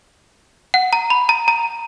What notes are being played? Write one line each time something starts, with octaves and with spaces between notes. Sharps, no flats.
F#5
A#5
B5
A#5
A#5